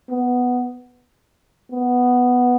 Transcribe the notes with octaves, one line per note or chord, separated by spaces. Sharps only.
B3
B3